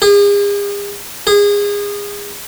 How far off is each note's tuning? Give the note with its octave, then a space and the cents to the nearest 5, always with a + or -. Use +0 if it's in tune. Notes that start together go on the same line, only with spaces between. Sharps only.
G#4 -40
G#4 -25